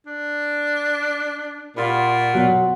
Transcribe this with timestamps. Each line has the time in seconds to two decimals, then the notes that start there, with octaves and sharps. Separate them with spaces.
0.06 D4
1.76 A#2 G3 F4 F#4
2.34 B2 F#3 F#5